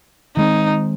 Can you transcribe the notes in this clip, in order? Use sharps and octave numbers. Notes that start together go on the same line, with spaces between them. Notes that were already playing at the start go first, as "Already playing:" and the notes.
D#3 G#3 C4 D#4